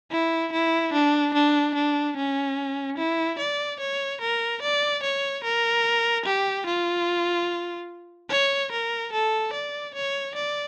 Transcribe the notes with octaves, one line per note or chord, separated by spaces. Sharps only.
E4
E4
D4
D4
D4
C#4
E4
D5
C#5
A#4
D5
C#5
A#4
G4
F4
C#5
A#4
A4
D5
C#5
D5